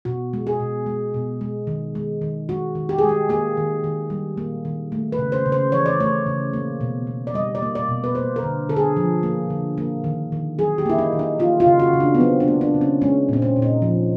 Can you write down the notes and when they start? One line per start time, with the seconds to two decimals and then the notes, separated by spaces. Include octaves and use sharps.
0.05 B2 F#4
0.33 G#3
0.47 G#4
0.60 B2
0.86 G#3
1.14 B2
1.41 G#3
1.67 D#3
1.95 G#3
2.22 D#3
2.49 G#3 F#4
2.75 D#3
2.89 G4
2.98 G#4
3.03 G#3
3.09 G4
3.29 A#3 G#4
3.57 D#3
3.84 D#3
4.10 G3
4.37 A#3
4.65 D#3
4.92 A3
5.12 B4
5.19 C#3
5.32 C5
5.46 C#3
5.52 C5
5.72 E3 C#5
5.86 D5
6.00 A3 C#5
6.26 C#3
6.53 A#3
6.81 B2
7.07 B2
7.27 D5
7.34 G3 D#5
7.55 D5
7.62 A#3
7.75 D5
7.89 B2
8.04 B4
8.15 A#3 C5
8.36 A#4
8.43 D3
8.69 D3 A4
8.76 G#4
8.97 F3
9.23 A#3
9.50 D3
9.78 A#3
10.04 D#3
10.32 D#3
10.59 F#3 G#4
10.78 G4
10.86 A#3 E4
10.99 D#4
11.13 D#3
11.19 D#4
11.39 A#3 F4
11.60 F4
11.66 C#3
11.80 F#4
11.93 C#3
12.00 D4
12.14 B3
12.20 F#3 C4
12.40 D4
12.48 A#3
12.61 D4
12.74 C#3
12.81 C#4
13.02 G#3 C#4
13.29 A#2 C4
13.42 C#4
13.56 A#2
13.62 D#4
13.82 F3